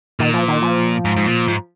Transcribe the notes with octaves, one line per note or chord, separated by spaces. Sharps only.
A#2 D#3
F3
D#3
F3
G#2
G#2
A#2
G#2